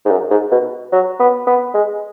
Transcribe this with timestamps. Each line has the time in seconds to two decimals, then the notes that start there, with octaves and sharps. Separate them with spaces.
0.05 G#2
0.10 F#2
0.31 G#2
0.51 B2
0.92 F#3
1.20 B3
1.47 B3
1.74 G#3